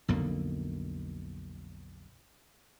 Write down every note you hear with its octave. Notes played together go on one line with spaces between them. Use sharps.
B1 F2 D3 A#3